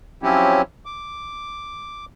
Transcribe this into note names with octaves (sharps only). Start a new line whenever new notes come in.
F3 F#3 C4 C#4 E4 G4
D6